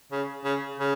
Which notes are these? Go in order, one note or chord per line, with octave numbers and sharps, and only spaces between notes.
C#3
C#3
C#3